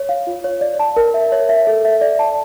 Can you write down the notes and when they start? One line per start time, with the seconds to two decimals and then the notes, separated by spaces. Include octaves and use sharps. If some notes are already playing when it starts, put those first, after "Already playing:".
Already playing: C#5
0.09 F5
0.27 F4
0.44 C#5
0.61 D5
0.80 A5
0.96 A#4
1.14 E5
1.32 C#5
1.49 E5
1.67 A4
1.85 E5
2.01 D5
2.19 A5